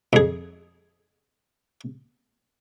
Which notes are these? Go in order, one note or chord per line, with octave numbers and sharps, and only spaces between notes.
F2 G#4